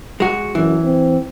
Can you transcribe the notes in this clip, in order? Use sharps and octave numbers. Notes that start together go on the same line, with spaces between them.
G#3 F#4
F#2 E3
C4